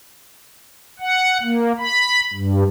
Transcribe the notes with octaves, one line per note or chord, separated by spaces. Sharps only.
F#5
A#3
B5
G2